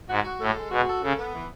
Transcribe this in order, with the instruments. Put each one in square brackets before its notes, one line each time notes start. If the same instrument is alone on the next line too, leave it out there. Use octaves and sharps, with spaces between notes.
[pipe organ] G#2 [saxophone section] F#4
[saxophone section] F#4
[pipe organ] A2 [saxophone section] A4
[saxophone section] G#3
[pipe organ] B2 [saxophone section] F#4
[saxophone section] A4
[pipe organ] C#3 [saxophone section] A4
[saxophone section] B3
E3